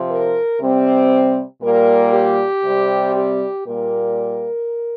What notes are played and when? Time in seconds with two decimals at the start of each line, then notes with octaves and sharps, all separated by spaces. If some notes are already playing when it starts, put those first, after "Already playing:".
Already playing: C3 F3 C4
0.09 A#4
0.60 C3 G3 C4
1.62 A#2 G3 A#3 A#4
2.12 G4
2.64 C3 G3 C4
3.15 G4
3.65 A#2 G3 A#3 A#4